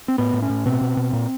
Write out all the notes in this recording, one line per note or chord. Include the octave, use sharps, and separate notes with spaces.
C4
A2 B3
A2
C#4
A2
B2 C4
B2
B2
A#2